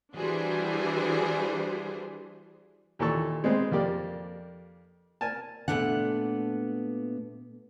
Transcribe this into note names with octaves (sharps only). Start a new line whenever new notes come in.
E3 G3 D4 F#4 G#4 C5
D#2 A#2 E3 A4 A5 C#6
G#3 B3 C4 B4
F2 A#3 G4 D5
A#4 G#5 A5
A#2 A3 B3 D4 F#5